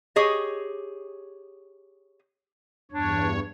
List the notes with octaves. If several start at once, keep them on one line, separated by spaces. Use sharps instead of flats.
G4 G#4 C#5 D#5
E2 G2 D4 C#5